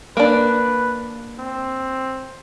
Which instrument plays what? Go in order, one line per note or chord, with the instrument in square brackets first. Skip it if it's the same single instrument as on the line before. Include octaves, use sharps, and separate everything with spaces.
[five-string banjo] A#3 D4 [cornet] B4
[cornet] C4